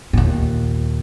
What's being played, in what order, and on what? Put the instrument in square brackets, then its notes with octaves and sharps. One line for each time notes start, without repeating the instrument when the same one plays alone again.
[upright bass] D#2 A#2